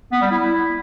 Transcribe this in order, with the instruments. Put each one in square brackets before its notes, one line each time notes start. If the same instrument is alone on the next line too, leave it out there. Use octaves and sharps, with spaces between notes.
[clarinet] B3
G3
E4